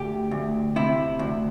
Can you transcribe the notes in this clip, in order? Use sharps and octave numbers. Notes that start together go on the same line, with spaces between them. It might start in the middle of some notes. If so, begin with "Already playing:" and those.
Already playing: D2 G4
D2
C3 E4
D2